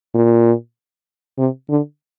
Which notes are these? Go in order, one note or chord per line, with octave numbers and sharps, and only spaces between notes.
A#2
C3
D3